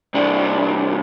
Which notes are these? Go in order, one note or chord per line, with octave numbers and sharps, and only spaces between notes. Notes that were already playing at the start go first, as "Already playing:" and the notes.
C2 D4